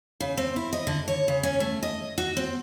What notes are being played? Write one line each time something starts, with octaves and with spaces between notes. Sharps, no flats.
C#3
C4
E4
D#5
D3
C#5
C#3
C#4
A3
D#5
F#4
C4